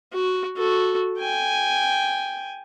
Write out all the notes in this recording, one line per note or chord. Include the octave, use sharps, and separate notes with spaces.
F#4
F#4 A4
G5 G#5